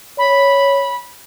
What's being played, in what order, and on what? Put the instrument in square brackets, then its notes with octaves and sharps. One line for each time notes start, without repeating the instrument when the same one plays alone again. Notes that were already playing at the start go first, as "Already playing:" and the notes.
[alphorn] C#5 [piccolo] B5